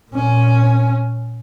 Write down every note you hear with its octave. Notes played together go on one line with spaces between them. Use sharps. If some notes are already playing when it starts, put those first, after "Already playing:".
A#2 C#4